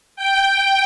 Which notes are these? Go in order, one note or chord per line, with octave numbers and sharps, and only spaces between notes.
G5